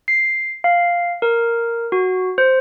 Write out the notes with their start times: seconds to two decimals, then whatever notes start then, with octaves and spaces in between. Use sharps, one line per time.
0.08 C7
0.64 F5
1.22 A#4
1.92 F#4
2.38 C5